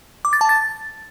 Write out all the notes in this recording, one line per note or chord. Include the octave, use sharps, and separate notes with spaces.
D6
A6
A5
A6